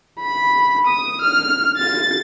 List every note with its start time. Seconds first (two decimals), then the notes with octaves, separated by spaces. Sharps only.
0.19 B5
0.87 D#6
1.22 F6
1.77 A6